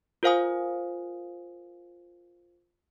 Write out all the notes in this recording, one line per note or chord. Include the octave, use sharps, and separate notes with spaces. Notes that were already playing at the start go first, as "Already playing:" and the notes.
F4 A#4 C5 F5 G#5 D#6